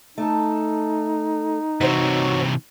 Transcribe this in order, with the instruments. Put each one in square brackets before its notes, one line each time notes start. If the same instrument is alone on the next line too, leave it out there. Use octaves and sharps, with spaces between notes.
[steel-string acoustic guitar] A3 A4 [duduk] D#4
[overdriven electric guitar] C3 E3 [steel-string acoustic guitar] F#4 C5 C#5